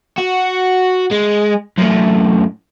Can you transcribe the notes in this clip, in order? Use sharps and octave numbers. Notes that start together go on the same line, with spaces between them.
F#4
G#3
F#2 A2